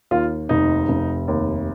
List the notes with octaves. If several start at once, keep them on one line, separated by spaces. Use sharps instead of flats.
D#2 F4
F1 D#4
F1
D#2